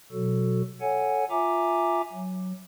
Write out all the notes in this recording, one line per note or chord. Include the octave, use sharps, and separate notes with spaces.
B2 F#3 F#4 A4
A4 C#5 F#5 G#5
F4 E5 G#5 A#5 D6
F#3